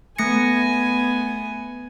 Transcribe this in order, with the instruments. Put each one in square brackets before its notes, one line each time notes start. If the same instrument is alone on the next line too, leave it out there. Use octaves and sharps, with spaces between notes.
[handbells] A3 A#6 C#7 [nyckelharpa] B3 G#5